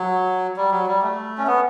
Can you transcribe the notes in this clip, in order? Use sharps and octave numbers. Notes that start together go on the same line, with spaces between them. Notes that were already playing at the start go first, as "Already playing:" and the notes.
Already playing: F#3
G3
F#3
G3
A3
C#4
B3